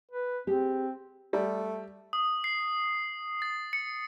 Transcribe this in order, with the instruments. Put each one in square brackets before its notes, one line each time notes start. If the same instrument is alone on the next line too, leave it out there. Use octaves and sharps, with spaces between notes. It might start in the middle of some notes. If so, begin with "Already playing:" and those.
[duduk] B4
[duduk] C4 [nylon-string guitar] G4 G#4
[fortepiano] G3 [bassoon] A3
[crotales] D#6
C7
A6
C#7